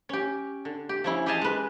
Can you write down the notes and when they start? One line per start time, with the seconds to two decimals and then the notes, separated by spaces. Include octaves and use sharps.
0.09 C#4 G4
0.65 D3
0.89 G4
1.04 F3 C#4 E4
1.26 G4 G#4 D#5 F5 G#5 A5
1.41 G#3 B4